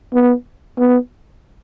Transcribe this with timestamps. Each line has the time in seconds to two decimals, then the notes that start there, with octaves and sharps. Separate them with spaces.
0.14 B3
0.78 B3